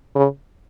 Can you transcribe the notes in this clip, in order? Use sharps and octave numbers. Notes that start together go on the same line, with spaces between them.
C#3